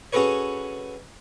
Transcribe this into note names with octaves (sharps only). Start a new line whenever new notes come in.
C#4 F#4 G#4 A4 B4 C#5